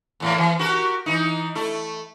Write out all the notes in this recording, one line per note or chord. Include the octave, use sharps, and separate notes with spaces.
E2 A2 A#3
E3
F#4 G4 A#4
E3 D#4
A3 E4